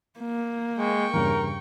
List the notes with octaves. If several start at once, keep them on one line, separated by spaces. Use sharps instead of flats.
A#3
G#3 G5 C#6
E2 G2 C#3 A#4